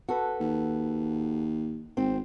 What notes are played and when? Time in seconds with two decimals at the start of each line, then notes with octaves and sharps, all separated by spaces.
0.08 F#4 A4 B4
0.40 D#2
1.97 G#1 C4